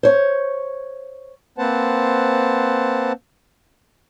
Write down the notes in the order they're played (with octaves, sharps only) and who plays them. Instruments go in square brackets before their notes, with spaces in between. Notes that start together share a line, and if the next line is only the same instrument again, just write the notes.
[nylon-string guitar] C5 C#5
[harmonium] A#3 C4 B4 C5 F#5 A5